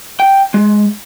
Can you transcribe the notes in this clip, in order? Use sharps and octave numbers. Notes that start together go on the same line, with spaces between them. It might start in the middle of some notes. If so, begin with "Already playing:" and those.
G5
G#3